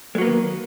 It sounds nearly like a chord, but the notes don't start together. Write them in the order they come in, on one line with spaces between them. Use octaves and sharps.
G#3 F#3 A#3 B3 D#3